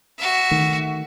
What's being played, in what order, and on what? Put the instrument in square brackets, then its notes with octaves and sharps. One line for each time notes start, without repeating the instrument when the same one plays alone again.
[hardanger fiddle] F#4 E5
[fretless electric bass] D#3 A3